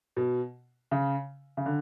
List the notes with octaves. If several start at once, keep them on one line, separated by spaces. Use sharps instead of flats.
B2
C#3
C#3
D3